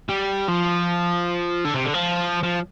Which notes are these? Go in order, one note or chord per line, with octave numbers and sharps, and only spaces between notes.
G3
F3
D3
C3
D3
F3
F3